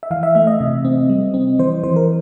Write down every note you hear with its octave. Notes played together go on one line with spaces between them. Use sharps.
E5
E3 F5
E5
A3 E5
D#5
C3
C4
G3
C4
E3 C5
E3 C5
A#4